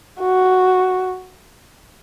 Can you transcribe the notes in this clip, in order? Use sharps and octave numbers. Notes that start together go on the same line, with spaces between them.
F#4